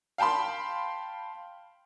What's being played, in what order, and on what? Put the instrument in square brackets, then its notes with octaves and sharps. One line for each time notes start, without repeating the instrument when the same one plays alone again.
[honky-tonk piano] F5 G5 A5 B5 C6